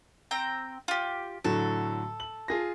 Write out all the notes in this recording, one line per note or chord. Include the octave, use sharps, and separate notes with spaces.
C4 G5 A#5
F4 G4
A2 D3 F#3 A4
F#7
F4 G#4 A#6